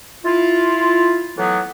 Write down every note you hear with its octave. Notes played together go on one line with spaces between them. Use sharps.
E4 F4
A2 E3 F#3 B3